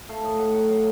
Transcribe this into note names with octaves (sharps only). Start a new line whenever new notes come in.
A3 F5
A2 D#5
A2 F#5
F#3 F#5
F#3 F5